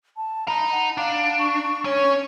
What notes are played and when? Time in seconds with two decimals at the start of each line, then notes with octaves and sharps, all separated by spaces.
0.17 A5
0.48 D#4 A#5 B5
0.72 F#5
0.97 D4 F5
1.39 C#6
1.85 C#4 C#5